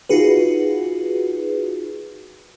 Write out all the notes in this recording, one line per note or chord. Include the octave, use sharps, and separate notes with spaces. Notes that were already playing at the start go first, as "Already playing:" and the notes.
D#4 F4 F#4 G#4 B4